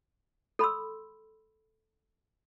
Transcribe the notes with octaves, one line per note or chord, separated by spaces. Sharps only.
A4 B5 C6 E6